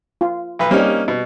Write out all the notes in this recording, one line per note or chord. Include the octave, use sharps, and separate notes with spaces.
F4
B1 B4
G3 A#3 C4 C#4 D#4
B2